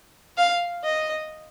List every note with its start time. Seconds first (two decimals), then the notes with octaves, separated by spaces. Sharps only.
0.37 F5
0.84 D#5